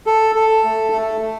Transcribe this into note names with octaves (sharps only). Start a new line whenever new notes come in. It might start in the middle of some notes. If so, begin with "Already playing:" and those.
A4
A4
A3
A3
A3